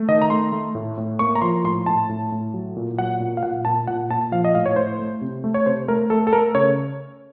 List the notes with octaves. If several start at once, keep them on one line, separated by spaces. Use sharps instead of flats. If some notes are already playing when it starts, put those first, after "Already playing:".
Already playing: A3
D#3 D#5
A#5
A3 C6
A3
A2
A2
A#3 C#6
A#5
F3 C6
A2 C6
A2 A5
A2
A2
F#3
A#2
F#3 F#5
A#2
F5
A#2 F#5
A#2 A5
A#2 F#5
A#2 A5
F3 F5
D#5
A2 F5
C#5
A2 C5
A3
C3
A3
C#5
C3 C5
A3 A#4
A3 A4
A4
A3 A#4
C#3 C#5